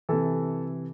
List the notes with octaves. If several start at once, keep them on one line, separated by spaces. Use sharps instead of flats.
C3 E3 A4